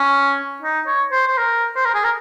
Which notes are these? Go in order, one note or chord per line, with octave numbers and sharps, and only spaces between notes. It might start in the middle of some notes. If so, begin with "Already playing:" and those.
Already playing: C#4
D#4
C#5
C5
C5
A#4
C5
A#4
G#4
A#4